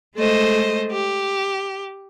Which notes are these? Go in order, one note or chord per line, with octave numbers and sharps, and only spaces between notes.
G#3 A3 C5 D#5
G4